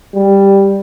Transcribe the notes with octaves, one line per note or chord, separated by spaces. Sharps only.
G3